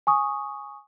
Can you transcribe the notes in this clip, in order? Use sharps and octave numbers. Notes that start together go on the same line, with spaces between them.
G#5 C#6 D#6